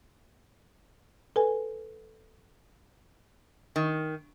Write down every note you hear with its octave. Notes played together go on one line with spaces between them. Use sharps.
A4 B4 G#5
D#3